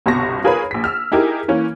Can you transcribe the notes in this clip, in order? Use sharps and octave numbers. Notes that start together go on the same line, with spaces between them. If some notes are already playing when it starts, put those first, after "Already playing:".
G1 C2 B2 A5 C#6 A#6
F4 G#4 A#4 B4 C#5 B5
A#1 B6
E6 F6
D#4 E4 G4 G#4 A#4
E3 A#3 C#4